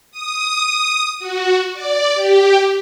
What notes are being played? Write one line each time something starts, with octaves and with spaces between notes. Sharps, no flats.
D#6
F#4
D5
G4